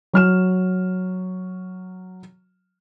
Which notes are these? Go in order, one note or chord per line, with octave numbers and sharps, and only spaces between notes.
F#3 F6 E7